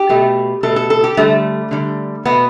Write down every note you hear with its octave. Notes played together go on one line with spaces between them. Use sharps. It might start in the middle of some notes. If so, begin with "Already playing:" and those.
Already playing: G4
B2 A3
B2 A3 A4
A4
A4
G4
D3 G3 A3
D3 G3
B2 A3 B3